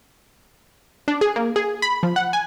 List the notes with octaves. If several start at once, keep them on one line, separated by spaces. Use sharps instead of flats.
D4
G#4
A#3
G#4
B5
F3
F#5
G#5